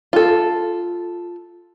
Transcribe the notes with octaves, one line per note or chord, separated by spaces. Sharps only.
F4 A4